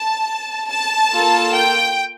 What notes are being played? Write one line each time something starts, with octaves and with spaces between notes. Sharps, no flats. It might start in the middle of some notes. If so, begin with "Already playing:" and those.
Already playing: A5
A5
A#3 F4 A4
G5